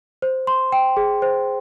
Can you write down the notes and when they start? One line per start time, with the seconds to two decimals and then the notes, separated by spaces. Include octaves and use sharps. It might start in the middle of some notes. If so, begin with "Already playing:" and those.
0.22 C5
0.47 C6
0.72 G5
0.97 G#4
1.22 C5